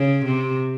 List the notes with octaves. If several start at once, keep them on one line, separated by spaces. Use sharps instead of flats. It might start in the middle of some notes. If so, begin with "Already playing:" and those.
Already playing: C#3
C3